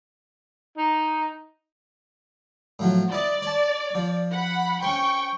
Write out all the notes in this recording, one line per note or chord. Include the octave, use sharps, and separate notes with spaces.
D#4
A2 F3 F#3
E4 D5 D#5
C#5 A5
F3
F#5 B5
C#4 C5 G5 C#6